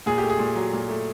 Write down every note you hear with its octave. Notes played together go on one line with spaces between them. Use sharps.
A#2 G#4
G4
A3
G#4
A#2
F#3
A#2
A3